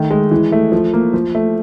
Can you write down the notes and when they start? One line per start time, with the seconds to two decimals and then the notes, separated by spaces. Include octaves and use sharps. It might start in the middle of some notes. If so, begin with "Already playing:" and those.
Already playing: D#3 A3
0.10 G#3
0.31 E3
0.52 A3
0.72 F3
0.93 A#3
1.13 F3
1.35 A3